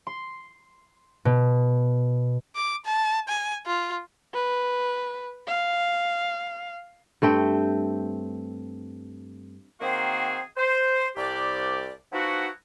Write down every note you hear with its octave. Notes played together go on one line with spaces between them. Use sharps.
C6
B2
D6
A5
G#5
F4
B4
F5
G2 A3 C4 G5
D#3 A#3 C4 F#4 G#4 C5
C5
C2 G4 D5
F3 B3 D#4 E4 F#4